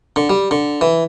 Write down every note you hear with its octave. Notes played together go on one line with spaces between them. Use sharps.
D3
G3
D3
E3